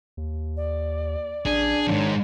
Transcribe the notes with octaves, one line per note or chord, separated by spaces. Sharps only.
D#2
D5
A1 D4 G#4
F2 G#2 D#3 C#5